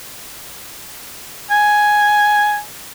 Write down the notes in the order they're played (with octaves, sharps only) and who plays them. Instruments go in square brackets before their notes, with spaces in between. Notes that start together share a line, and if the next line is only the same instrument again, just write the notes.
[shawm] G#5